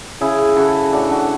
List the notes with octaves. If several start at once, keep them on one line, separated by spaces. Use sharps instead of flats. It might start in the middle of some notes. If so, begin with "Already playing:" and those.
C#3 E4 G#4
C#3 F#4 A4
A2 D4 F#4
D4 F#4